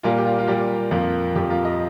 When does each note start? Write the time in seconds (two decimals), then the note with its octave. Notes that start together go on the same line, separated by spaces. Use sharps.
0.03 A#2 G3 A#3 F4
0.18 G4
0.25 F4
0.39 F4
0.47 A#2 G3 A#3 G4
0.91 F2 F3 A#3 F4
1.35 F2 F3 A#3 G4
1.50 F4 A#4
1.65 A#4 D#5